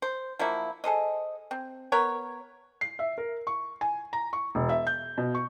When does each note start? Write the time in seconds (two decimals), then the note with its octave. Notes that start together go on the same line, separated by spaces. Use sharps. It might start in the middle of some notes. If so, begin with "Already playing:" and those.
0.02 C5
0.39 F3 F#3 A#3 E4
0.84 G#4 A4 C5 D#5
1.51 C4
1.92 B3 A#4 C#5
2.81 C7
2.99 E5
3.18 A#4
3.47 C#6
3.81 G#5
4.13 A#5
4.33 C#6
4.55 E1
4.69 E5
4.87 G6
5.18 B2
5.35 C#6